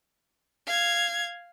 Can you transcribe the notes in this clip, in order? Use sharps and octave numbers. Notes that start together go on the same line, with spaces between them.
F5 G#6